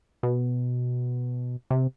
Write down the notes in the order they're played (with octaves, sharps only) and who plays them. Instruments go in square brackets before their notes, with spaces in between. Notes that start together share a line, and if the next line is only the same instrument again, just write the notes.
[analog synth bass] B2
C3